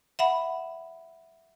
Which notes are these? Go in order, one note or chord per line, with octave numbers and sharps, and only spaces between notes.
E5 F#5 B5